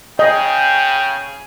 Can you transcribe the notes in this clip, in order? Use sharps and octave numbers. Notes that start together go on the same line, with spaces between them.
C#3 G#4 D#5 G5